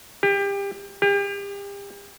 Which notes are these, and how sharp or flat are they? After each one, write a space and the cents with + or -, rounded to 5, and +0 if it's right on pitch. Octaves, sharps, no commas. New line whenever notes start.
G4 +25
G4 +35